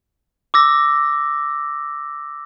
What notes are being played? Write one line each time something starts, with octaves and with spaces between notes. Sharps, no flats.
D6 E6 A#6